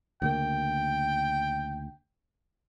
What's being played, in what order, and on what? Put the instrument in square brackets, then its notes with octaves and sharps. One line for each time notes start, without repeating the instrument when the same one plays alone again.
[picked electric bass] D2 C#3 A#3 [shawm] G5